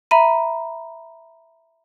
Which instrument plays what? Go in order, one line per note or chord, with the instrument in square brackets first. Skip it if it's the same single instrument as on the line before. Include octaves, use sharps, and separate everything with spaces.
[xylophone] E5 A#5 B5 D#7